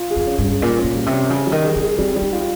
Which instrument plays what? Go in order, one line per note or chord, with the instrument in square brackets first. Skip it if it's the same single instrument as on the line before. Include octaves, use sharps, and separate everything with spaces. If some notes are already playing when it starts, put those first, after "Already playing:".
Already playing: [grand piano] F4
G#4
[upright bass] F2
[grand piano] C#4
[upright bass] G2
[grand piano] G#4
[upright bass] A#2 [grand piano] F4
[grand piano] C#4
[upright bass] A#2
[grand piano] G3
[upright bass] C3
[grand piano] C#4
[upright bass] C#3 [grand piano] G3
[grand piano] G3
[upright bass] D#3
[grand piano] G#4
[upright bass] D#3
[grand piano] G#4
[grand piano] G3 [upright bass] C4
[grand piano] G3
[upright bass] D#4
[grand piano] F4